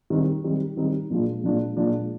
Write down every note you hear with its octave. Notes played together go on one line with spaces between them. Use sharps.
D#3 G3 C4 D#4
D#3 G3 C4 D#4
D#3 G3 C4 D#4
A#2 F3 G#3 D4 F4
A#2 F3 G#3 D4 F4
A#2 F3 G#3 D4 F4